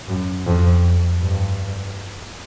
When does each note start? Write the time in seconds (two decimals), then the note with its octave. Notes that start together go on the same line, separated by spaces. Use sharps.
0.09 F#2
0.46 F2
1.21 G2